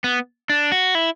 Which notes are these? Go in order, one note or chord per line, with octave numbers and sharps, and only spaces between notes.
B3
D4
F#4
E4